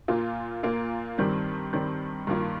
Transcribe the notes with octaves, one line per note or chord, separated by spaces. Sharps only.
A#2 A#3 F4
A#2 A#3 F4
G2 D#3 G3 C4
G2 D#3 G3 C4
G2 D#3 A#3 F4